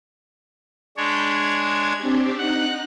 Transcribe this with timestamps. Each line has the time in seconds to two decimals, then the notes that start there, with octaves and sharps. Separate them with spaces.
0.97 G#3 D4 C#5 B5 G6
1.27 G#6
1.98 C4 D4 G4
2.38 D#4 F#5 F#6